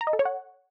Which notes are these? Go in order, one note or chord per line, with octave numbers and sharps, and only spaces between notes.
A#5
D#5
A4
C#5
F#5